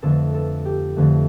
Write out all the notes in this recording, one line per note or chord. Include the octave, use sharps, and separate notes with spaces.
F2 D3 A3 A4
A4
G4
F2 D3 A3